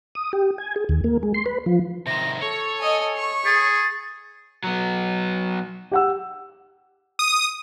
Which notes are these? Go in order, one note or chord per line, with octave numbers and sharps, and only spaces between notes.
D#6
G4
G#5
G#4
D#2
A#3
G#3
C6
B4
F3
C3 D#3 A#6
A4 C#5
D#5 G#5
C#6
G#4 A6
F#3 B3
G4 F#5 E6
D#6